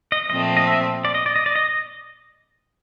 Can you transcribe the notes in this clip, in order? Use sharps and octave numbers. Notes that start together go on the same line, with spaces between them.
D#5
A#2 F3 A3 C4 D#5
D#5
E5
D5
D#5
D5
D#5
D5
D#5